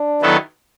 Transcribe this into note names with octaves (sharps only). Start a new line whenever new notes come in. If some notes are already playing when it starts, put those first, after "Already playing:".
Already playing: D4
D#3 F#3 B3 E4 A4